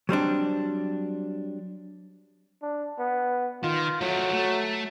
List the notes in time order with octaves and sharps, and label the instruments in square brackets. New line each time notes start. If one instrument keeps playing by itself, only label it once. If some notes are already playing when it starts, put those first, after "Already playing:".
[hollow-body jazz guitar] F#3 G3 C4 D4
[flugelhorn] D4
B3
[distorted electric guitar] D#3 [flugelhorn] F4
[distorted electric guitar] F3 A3 [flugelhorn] F#3
[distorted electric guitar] A3